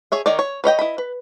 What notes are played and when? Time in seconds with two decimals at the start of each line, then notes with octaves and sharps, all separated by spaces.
0.12 G#4 C#5 E5
0.26 D#3 D#4 A#4 C#5 D5
0.39 C#5
0.64 B4 C#5 D#5 G5
0.79 E4 D#5 B5
0.98 B4